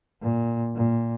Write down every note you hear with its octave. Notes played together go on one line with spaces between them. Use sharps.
A#2
A#2